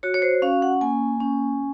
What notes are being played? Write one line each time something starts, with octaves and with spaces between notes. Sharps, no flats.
F#4 C#5
C#5
C5
C#4 F5
F#5
A#3 G#5
C#4